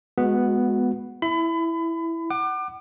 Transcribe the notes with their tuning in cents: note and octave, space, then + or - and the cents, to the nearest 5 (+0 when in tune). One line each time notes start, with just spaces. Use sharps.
G#3 +0 B3 +0 F#4 -20
E4 +0 B5 +30
F#5 +25 D6 +30